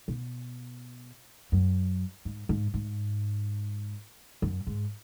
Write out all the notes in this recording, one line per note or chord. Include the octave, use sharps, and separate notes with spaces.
B2
F#2
G#2
G#2
G#2
F#2
G#2